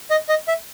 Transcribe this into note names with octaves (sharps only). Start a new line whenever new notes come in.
D#5
D#5
E5